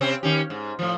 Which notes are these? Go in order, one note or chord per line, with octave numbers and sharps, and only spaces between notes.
C3 C4 C#4
D#3 C#4 G4
G#2
A2 F3